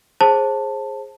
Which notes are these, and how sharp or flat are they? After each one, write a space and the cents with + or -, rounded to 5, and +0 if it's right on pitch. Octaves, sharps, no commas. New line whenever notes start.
G#4 +0 C5 +30 A5 +10